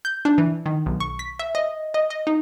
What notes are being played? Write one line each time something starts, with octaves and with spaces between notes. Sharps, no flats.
G6
D4
E3
D#3
B1
C#6
B6
E5
D#5
D#5
D#5
D#4